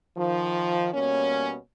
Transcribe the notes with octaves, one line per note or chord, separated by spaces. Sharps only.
D#3 F3
B2 G3 A#3 C#4